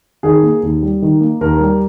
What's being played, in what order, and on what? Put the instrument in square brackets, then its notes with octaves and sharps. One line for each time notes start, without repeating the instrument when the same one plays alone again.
[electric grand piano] D#3 [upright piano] G#4
[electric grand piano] A#3
D#2
G3
D#3
A#3
[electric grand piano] D#2 [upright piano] A#4
[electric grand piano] G3